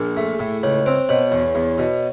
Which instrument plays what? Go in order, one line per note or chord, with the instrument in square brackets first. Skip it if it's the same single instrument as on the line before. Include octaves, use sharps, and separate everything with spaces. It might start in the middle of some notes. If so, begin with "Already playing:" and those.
Already playing: [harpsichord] A#1 [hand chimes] G#4
[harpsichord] A3
A2
[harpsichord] C#2 [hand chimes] C#5
[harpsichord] C4 [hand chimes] C5
[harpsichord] B2 [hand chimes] C#5
[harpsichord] E2 [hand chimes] C#5
[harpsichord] E2
B2